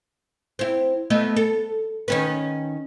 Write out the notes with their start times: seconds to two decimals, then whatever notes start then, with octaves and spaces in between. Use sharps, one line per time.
0.59 C4 E4
1.10 A3 B3 D#5
1.37 A4
2.08 D#3 C#4 B4